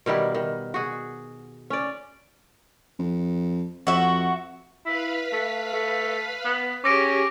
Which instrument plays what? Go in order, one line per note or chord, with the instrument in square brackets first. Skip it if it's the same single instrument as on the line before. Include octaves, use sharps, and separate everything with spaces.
[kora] B2 D#3 G3 E4
D#3
F#4 G#4
C#4 D5
[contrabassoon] F2
[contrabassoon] F2 [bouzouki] F#4 E5
[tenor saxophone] E4 [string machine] B4 F5 B5
[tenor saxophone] A3
A3
B3
[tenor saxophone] C#4 [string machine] G4 G#4 [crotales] D6 A#6 D7